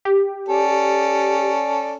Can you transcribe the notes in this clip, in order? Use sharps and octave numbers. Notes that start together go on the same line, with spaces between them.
G4
C#4 A4 D5